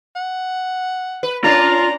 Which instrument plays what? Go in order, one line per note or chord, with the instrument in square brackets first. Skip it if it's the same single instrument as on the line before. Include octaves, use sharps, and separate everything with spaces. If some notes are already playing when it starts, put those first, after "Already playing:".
[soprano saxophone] F#5
[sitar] B4
[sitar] A#3 C#4 D4 [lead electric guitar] F4 [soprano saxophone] A#5